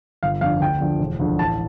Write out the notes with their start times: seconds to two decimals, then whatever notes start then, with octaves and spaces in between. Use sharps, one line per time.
0.23 G1 F5
0.41 F2 D3 F5
0.61 D2 G5
0.81 D3 F3
0.99 E1
1.20 D2 D3 F3
1.38 A1 A5